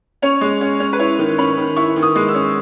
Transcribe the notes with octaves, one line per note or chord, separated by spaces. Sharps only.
C#4 C#5
G#3
C#4
C#4
B4
E4 C#5
D#3
C#4 B5
D#3
E4 C#6
D#3
D#6
G#3
E6
C#4